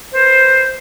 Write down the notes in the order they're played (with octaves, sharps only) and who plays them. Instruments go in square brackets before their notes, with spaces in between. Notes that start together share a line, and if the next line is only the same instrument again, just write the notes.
[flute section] B4 C5